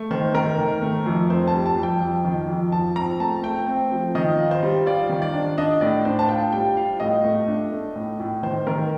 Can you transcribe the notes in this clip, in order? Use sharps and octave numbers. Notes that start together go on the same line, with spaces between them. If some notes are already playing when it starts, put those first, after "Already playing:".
Already playing: A3
D#3 C5
D#3 A#4
D#3
A3
F2
C4 C5
A5
G3
A5
F2
G5
F2
D#3
F2
F3 A5
C4 A#5
A3 A5
A3 G5
C4
F3
D#3 D#5
F4
C5
G3
F4 D5
D#3
D5
D4
D4 D#5
A2 D5
D4 C5
A5
F4 G5
G3 G5
F4 F5
A2 D#5
A3
D4
A3
A2
A2
D#3 C5
D#3 A#4